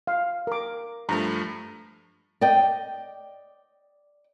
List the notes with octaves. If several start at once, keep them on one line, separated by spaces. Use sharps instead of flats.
F5
A#4 D6
G2 F3 A3 A#5
D5 D#5 G5